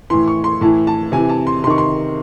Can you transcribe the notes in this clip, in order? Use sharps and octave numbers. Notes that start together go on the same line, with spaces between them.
A2 E3 C6
C#6
C6
A2 E3 A5
A5
C3 E3 G#5
A5
C6
C3 D#3 C6 C#6
C6